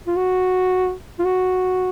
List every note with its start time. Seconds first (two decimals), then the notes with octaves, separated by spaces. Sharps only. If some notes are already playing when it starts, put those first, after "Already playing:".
0.07 F4
0.16 F#4
1.19 F4
1.25 F#4